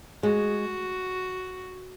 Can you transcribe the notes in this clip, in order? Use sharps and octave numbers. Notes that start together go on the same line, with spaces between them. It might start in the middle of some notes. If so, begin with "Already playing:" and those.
G#3 F#4